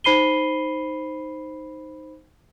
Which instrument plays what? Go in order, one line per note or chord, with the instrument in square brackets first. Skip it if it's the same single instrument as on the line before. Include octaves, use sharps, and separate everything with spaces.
[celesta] D#4 C5 B5 C7 D#7 G7